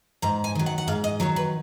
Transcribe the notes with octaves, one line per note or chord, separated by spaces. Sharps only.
G#2 A#5
G#5
D#3 F#3
F#5
F#5
G#2 F5
D#5
D#3 F#3 C#5
B4